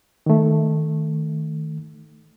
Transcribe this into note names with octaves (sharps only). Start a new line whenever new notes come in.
D#3 A3